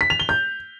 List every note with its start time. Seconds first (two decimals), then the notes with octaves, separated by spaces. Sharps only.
0.01 B6
0.10 F7
0.20 G7
0.29 G6